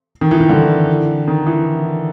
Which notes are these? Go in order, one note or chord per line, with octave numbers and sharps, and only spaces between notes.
D#3
E3
D#3
D3
D#3
E3